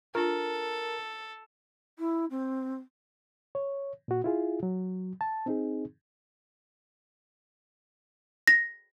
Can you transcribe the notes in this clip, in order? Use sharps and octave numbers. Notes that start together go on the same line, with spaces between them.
D4 F4 A4 A#4
E4
C4
C#5
A#2 F#4
E4 F4 G#4
F#3
A5
C4 D#4 G#4
A#6